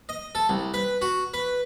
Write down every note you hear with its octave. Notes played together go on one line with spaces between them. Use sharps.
D#5
A4
C2
B4
F#4
B4